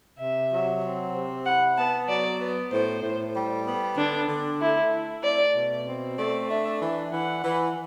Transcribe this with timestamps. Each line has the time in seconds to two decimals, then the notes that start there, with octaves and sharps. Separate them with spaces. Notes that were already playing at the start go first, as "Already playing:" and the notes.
0.19 C3 E5
0.51 F#3
0.82 C4
1.13 C3
1.45 E4 F#5
1.78 B3 A5
2.08 F#3 D5
2.40 B3
2.72 A2 C5
3.02 A2
3.35 G3
3.66 B3
3.97 D3 D4
4.28 D3
4.61 A3 E4
4.92 E4
5.24 A3 D5
5.56 B2
5.86 C4
6.18 A3 D5
6.49 D4 E5
6.81 E3
7.12 E3 F#5
7.43 E3